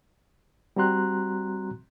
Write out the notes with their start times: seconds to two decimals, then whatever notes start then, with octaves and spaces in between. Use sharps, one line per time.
0.76 G3 C4 F#4 A#5 C6 F#6